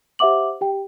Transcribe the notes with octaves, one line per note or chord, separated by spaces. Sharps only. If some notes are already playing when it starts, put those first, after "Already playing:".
G4 C5 E5 F#5 D6 F#7
G4 G5